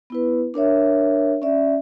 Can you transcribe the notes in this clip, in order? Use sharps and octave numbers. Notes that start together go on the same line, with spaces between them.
B3 E4 B4
D4 A#4 C#5 E5
C#4 D5 E5